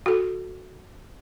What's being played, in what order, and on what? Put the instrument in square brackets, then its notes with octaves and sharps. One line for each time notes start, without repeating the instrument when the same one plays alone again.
[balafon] F#4 A4